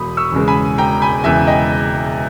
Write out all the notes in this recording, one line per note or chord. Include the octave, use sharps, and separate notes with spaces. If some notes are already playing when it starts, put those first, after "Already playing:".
Already playing: E1 B5 D#6
C#6 E6
E2 C#3 G#3
G#5 B5
E1 G5 A#5
G#5 B5
E2 C#3 G#3 E5 G#5
D#5 G5